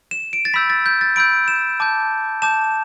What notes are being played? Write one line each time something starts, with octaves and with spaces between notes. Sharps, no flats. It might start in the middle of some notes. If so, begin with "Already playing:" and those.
E7
D7
A6
B5 E6 G6 B6
A6
G6
A6
B5 E6 G6 D7
E7
A5 D6 G6
A5 D6 G6 E7